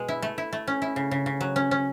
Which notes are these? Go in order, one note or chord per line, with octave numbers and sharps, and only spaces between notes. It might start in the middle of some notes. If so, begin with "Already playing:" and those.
Already playing: B2 G#3
E4
A3
E4
A3
C#4
E4
C#3
C#3
C#3
F#3
C#4
C#4